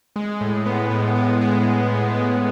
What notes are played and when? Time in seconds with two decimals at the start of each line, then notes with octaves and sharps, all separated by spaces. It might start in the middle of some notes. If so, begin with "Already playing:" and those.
0.16 G#3
0.41 A2
0.66 B3
0.91 A2
1.15 B3
1.41 G#3
1.67 A2
1.92 A2
2.16 G#3